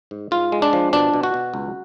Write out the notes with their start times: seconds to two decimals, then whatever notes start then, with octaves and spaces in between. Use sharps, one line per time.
0.11 G#2
0.31 G#2 F4
0.52 G#3
0.62 D4
0.73 F3
0.93 B2 D4
1.14 B2
1.23 F#4
1.34 B2
1.54 C#2